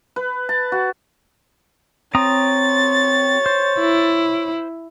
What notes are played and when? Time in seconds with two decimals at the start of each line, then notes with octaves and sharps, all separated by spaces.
0.16 B4
0.49 A5
0.72 F#4
2.15 C4 C#5 A#5 D#6 A6
3.46 C5
3.80 E4